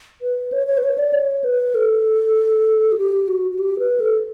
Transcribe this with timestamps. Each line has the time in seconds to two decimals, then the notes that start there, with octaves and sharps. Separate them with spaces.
0.22 B4
0.52 C#5
0.67 C#5
0.77 B4
0.83 C#5
0.98 D5
1.13 C#5
1.44 B4
1.75 A4
2.92 F#4
2.98 G4
3.28 F#4
3.51 F#4
3.59 G4
3.79 B4
4.00 A4